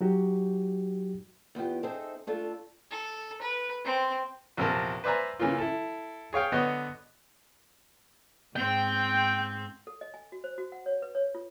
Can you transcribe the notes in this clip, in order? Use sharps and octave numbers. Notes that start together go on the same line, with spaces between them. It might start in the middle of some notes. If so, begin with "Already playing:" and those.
F#3 D#4 F#4 G4
E2 B3 F4 G4
C4 D#4 G#4 A4 C5 E5
A3 D4 F4 A4
A4
B4
C4
A#1 E2 C3 C4 A#4 A5
B4 C5 D5 E5 G#5 A#5
C#3 E3 A#3 C#4 F4
E4 A4
G#4 C#5 F5 G5
D3 B3 F#4 C#5 D#5
G#2 C4 G5
A4
D#5
G#5
F#4
C5
F#4
F#5
C#5
B4
C#5
F4